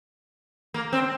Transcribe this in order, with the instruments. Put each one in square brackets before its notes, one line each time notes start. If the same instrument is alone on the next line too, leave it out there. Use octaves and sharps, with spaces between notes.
[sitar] A#3
C4